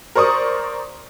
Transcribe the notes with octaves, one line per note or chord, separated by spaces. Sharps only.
A#4 C5 D5 C#6 D#6